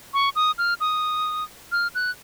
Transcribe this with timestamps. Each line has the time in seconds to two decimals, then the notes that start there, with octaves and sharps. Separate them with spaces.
0.14 C#6
0.36 D#6
0.58 F6
0.81 D#6
1.72 F6
1.95 F#6